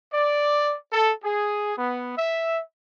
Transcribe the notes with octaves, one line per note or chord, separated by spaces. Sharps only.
D5
A4
G#4
B3
E5